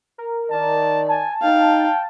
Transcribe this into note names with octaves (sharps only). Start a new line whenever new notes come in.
A#4
D#3 D5 A5
G#5 A5
D#4 F5 G5